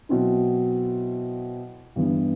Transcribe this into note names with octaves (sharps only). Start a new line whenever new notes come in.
B2 F#3 C4 E4
G2 E3 B3